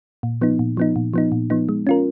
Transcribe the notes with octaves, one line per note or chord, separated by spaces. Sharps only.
A#2
F3 B3 D#4
A#2
F3 B3 D#4
A#2
F3 B3 D#4
A#2
F3 B3 D#4
G#3
C#4 F4 A#4